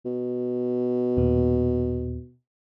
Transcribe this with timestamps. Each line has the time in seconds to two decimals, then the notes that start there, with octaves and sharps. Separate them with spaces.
0.05 B2
1.17 D#2 A#2 B3